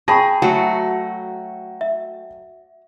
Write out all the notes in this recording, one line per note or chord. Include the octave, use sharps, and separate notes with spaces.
G#4 G5 A5 B5 C#6 A#6
F#3 A3 F#4
E5